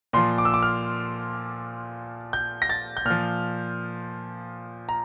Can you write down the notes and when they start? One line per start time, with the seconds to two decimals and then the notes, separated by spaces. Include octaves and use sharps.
0.13 A#2 F3 C6
0.38 D6
0.45 E6
0.54 D6
0.62 F6
2.33 G6
2.62 A#6
2.69 A6
2.97 G6
3.05 A#2 F3 F6
4.89 A#5